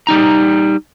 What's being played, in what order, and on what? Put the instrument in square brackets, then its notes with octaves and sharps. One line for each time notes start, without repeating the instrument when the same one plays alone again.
[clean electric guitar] G3 D#4 A#5